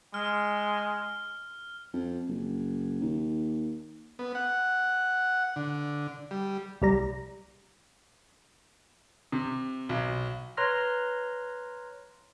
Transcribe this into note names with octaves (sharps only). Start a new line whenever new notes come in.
G#3 F6
F2
F#1
D#2
B3
F#5
D3
G3
C2 G3 A#5
C3
B1
B4 C#5 A#5 C6 F6 A#6